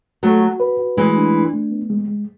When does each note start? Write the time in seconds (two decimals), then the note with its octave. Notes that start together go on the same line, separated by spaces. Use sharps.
0.23 F#3 A3 F#4
0.42 F#4
0.60 B4
0.79 F#4
0.97 E3 G#3 A3
1.16 D4
1.35 D4
1.54 A3
1.71 B3
1.90 G#3
2.08 G#3